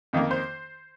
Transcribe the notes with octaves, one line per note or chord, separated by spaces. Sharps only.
F2 D#3 A#3
C5